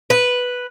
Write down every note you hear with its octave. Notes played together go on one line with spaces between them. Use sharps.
B4